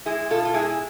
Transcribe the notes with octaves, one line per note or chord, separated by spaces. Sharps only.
G#3 E4 G#4
B2 F4 A4
F4
G#3 E4 G#4